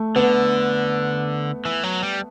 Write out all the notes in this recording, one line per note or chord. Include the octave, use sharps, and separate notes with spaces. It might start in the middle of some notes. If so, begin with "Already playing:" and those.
Already playing: A3
D3 B3
E3
F#3
G3